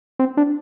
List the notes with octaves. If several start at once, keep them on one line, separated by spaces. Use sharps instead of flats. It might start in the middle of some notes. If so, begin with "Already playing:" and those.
C4
D4